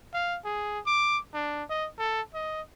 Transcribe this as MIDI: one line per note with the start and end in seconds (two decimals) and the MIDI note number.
0.13 0.39 77
0.45 0.79 68
0.86 1.18 86
1.34 1.63 62
1.70 1.87 75
1.98 2.22 69
2.34 2.62 75